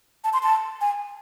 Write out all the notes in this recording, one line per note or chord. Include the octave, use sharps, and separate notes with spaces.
A5
C6
A5
G#5